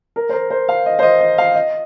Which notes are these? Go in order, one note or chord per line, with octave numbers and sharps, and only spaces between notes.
A#4
C5
A#4
C5
F5
D#5
C5
D#5
D#5
F5
D#5